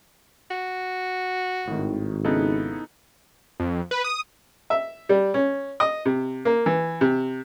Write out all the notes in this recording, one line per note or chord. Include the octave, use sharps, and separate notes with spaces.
F#4
G#1 A2 D#3
C#3 B3 D#4 E4 A4
F2
B4
D#6
E5
G3
C#4
D#5
C3
A#3
E3
C3